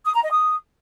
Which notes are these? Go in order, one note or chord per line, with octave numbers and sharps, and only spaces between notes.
D#6
A#5
D#5
D#6